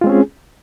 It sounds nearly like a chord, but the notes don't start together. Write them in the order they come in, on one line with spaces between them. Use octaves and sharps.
F4 G#3 C4 C#4 G#4